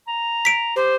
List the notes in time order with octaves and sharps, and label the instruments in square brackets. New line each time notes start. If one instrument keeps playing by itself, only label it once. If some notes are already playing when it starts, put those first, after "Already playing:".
[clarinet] A#5
[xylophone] B6 D7
[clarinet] G4 [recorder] C5